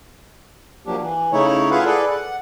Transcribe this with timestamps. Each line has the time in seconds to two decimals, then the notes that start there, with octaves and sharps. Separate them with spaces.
0.86 F3 F#3 A#3 D4 G4
1.02 E3
1.32 C#3 A3 D#4 E4 C#5
1.71 E4 F4 G#4 B4 F5 F#5
1.86 G#4 A4 B4 D5
2.10 F#5